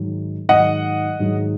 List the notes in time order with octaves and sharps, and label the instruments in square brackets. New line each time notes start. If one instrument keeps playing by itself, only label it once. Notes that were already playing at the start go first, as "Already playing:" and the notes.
Already playing: [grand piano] G#2 D#3 F#3
[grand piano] G#2 D#3 F#3 [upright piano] D#5 F#5
[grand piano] G#2 D#3 F#3